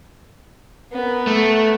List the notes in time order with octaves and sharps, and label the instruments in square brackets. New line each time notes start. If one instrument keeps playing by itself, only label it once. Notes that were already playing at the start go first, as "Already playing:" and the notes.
[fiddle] B3 A#4
[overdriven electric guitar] A3